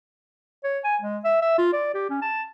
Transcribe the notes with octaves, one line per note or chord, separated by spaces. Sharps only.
C#5
G#5
G#3
E5
E5
F4
D5
G4
C#4
A5